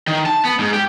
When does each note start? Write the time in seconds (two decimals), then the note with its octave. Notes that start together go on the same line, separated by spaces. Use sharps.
0.07 D#3
0.26 A5
0.45 B3
0.59 G#2
0.74 G4